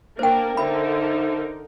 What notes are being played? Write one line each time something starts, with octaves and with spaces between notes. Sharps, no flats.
A#3 D4 A#4 C5 G5
D3 D#4 A#4 C5 E5 B5